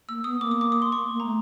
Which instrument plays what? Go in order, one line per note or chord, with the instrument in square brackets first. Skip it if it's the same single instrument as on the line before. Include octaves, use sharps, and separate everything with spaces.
[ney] A#3 [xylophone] E6
[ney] B3 [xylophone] D#6
[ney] A#3 [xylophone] D6
[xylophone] D#6
D6
D#6
C6
C#6
[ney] A#3
A#3
[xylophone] A#5
[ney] A3